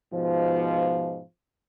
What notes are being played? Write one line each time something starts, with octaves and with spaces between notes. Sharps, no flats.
G#2 B2 F3